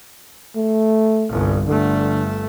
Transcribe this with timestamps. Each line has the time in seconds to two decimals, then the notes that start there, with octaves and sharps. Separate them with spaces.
0.55 A3
1.29 G1 C2
1.67 G1 D3 A3